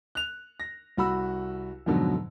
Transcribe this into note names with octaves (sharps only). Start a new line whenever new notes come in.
F#6 F7
A#6
C2 F#4 B5 E6
F2 G#2 B2 D3 F#3